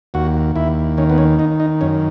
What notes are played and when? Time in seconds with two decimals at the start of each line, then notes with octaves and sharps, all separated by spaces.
0.14 D#2 F#4
0.56 D#2 E4
0.97 D#3 C#4
1.10 B3
1.18 C#4
1.39 D#3 D#4
1.60 D#4
1.81 F#2 C#4